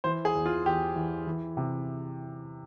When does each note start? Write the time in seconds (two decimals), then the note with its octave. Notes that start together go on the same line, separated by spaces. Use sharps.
0.04 E3 C5
0.25 G#4
0.35 E2
0.46 F4
0.66 E2 G4
0.96 E3
1.27 E3
1.57 C3